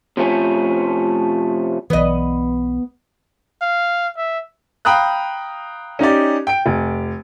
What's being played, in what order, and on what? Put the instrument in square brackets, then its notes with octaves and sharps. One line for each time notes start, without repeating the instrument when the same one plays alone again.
[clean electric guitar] C3 F3 A3 C#4
[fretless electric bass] B1 E3 [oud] B3 D#5
[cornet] F5
E5
[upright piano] F5 G5 A#5 B5 D#6 F#6
C#4 D#4 G4 D5
G5 D7
F1